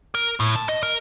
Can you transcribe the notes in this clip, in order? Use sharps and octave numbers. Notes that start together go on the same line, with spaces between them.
A#4
A2
A5
D#5
A#4